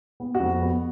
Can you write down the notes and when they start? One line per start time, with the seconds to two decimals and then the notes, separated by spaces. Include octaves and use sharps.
0.20 B3
0.35 F#4
0.40 F2
0.62 B3